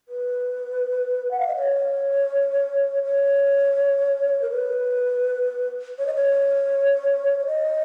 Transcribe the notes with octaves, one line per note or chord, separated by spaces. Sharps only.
B4
F#5
F5
D#5
C#5
C#5
A#4
B4
C#5
D#5
C#5
C#5
D#5